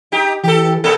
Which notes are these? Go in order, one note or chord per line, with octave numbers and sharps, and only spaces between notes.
D#4 G4
E3 G4 A4
B2 A#3 A4